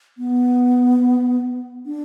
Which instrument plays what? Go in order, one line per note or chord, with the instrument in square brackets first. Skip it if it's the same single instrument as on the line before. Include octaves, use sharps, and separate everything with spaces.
[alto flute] B3
D4